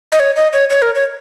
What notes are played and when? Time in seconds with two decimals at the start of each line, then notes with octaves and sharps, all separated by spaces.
0.12 D#5
0.20 C#5
0.36 D#5
0.53 C#5
0.70 C#5
0.82 A#4
0.95 C#5